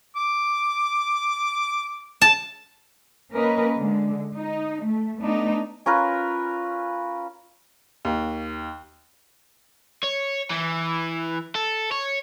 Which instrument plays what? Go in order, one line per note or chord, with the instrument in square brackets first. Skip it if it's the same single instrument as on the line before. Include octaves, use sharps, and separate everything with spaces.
[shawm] D6
[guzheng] A5
[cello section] A#3 C#4 A#4 B4 D#5
D3 G#3
D#4
A3
A3 B3 D4 D#4
[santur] C#4 F4 A#4 B4
[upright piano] D#2
[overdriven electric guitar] C#5
E3
A4
C#5